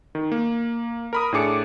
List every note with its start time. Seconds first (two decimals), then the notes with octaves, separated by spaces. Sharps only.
0.15 D#3
0.32 A#3
1.13 A#4 B5 D#6
1.32 A2 D4 G#4 D6 C#7